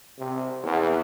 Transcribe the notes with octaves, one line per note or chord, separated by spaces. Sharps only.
C3
E2